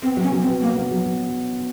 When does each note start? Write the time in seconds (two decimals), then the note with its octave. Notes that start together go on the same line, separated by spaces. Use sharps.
0.02 B3 C4
0.17 F#3
0.23 C#4
0.32 F#3
0.42 C4
0.47 B3
0.61 F#3 A#3
0.77 B3
0.91 F#3
1.06 F#3